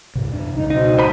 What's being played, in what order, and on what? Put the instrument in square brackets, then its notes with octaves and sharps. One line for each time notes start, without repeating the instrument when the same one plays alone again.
[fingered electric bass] G2 C3
E2 D4
[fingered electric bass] C#2 G2 C#3 [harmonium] D#4
[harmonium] B2 C4 [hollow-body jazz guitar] D#4
[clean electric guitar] C5 B5